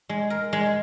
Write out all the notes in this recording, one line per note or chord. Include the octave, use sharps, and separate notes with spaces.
G#3
A#4
G#3